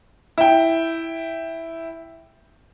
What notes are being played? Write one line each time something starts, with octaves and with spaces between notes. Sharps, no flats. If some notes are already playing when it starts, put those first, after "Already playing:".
E4 G5